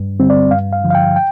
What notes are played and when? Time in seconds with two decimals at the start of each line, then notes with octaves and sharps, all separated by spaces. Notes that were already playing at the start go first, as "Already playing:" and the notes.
Already playing: G2
0.20 D3 G3 C4
0.30 D5
0.51 G2 F5
0.73 F5
0.84 D3 F3
0.91 F5
0.95 G5
1.16 G5